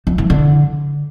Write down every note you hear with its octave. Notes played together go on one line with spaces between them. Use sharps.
F3
E3
D3